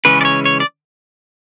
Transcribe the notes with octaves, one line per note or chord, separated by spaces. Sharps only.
C#3 E3 G#3 C#4 B4
D5
C#5
C#5
D5